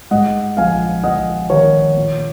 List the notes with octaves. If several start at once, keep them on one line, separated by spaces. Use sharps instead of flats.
G#2 D#5 F#5
A#1 F5 G#5
A#1 D#5 F#5
D#3 A#4 C#5
A#2